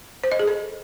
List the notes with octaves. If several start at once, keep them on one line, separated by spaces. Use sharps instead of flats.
C5
D#5
G#4
A4